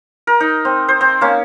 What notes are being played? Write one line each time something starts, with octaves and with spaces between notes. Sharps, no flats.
A#4
D#4
C4
C5
C4
A#3 C#4